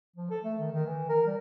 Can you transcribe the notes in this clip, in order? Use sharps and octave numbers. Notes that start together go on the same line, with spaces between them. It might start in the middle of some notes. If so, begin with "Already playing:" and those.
F3
A4
A3
D#3
D#3
E3
A#4
G3